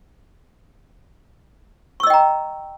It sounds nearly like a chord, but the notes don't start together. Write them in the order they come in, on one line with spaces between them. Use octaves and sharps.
C#6 E6 D#5 G5 A#5